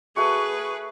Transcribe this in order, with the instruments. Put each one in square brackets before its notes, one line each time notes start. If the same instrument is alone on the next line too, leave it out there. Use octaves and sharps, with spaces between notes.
[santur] A3 F#4 C#6 [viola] G#4 B4